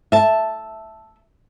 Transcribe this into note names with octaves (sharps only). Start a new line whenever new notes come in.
E5 A5